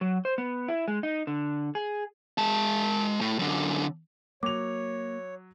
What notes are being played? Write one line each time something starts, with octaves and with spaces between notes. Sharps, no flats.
F#3
C5
B3
E4
G#3
D#4
D3
G#4
G#3 A5
A2
F#2 D3
F#3 A#3 C#5 D6 F7